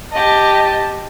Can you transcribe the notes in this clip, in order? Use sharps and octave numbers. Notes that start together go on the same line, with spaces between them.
G4 D#5 A5